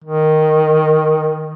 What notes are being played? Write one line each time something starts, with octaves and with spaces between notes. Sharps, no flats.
D#3